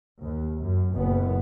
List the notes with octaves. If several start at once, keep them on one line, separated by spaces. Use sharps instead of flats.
D#2
F#2
F#1 A#2 B3